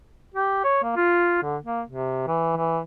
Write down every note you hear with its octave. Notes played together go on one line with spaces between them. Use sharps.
G4
C#5
A#3
F4
D3
A#3
C3
E3
E3